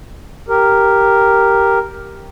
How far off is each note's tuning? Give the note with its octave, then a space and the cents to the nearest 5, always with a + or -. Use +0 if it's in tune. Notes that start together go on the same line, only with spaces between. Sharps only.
G4 +0 A#4 +0